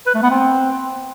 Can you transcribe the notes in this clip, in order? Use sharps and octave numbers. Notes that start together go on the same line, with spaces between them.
B4
A3
B3
C4